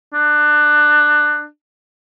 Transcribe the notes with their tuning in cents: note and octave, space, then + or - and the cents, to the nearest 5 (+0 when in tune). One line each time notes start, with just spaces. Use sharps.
D4 +20